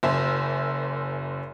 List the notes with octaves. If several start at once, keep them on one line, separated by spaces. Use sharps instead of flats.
F#1 F#2 C5 E5